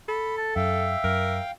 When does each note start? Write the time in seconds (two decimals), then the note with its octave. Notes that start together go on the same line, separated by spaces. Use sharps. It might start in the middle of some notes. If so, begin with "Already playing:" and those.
0.09 A4 B5
0.38 A5
0.56 F#2 E5 F5 G5
1.04 F#2 A#4